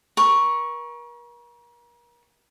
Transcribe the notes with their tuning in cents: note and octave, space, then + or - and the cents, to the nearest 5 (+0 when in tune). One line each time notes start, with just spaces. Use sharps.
A#4 +40 C#6 +0